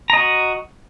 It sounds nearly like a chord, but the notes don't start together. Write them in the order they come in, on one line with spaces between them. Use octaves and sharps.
A#5 D#5 F#4